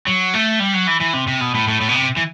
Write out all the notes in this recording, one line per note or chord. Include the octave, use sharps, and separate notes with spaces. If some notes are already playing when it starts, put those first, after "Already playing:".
F#3
A3
G3
F#3
E3
E3
C3
C3
B2
A2
A2
A2
B2
C3
E3